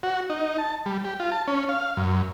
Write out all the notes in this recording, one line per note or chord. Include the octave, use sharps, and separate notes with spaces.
F#4
D#4
A5
G3
G4
F4
A5
C#4
F5
F#2